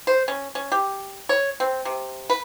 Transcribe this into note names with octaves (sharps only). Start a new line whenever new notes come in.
C5
C#4
C#4
G4
C#5
C4
C3
B4